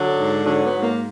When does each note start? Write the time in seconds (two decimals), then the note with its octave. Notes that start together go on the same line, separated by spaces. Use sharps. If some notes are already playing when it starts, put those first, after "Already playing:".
Already playing: D3 F#3 D4
0.18 G#2
0.45 D3 F#3 D4
0.63 B3
0.72 G#2
0.81 A#3